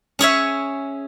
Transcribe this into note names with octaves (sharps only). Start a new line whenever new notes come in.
C#4 G#4 C#5 E5